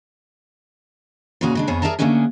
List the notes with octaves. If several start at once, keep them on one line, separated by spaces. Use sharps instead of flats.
A#2 C#3 E3 C#4 F#4 G#4
C#3 G#3 D4
F2 C#3 B3 G#4 C#5
G#4 A#4 D5 E5 A5 A#5
D3 A3 A#3 C#4 D4 G#4